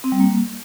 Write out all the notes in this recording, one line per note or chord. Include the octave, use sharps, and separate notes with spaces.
C4
G3
A#3